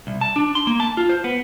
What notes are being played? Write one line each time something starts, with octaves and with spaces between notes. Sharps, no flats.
C2
A5
D4
C6
A#3
A5
F4
C5
B3